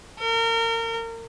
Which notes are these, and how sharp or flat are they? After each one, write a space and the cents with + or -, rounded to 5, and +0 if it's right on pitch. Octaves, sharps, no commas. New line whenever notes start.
A#4 -30